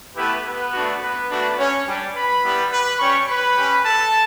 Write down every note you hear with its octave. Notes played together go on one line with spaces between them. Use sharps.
A3 B3 E4 G4 B4
B3 B4
A3 D4 F#4
B3 B4
A3 D4 F#4
C#4 C#5
G3 D4 G4
B4 B5
G3 B3 E4 G4
B4 B5
G3 C#4 G4 C#5 C#6
B4 B5
C#4 G4
A4 A5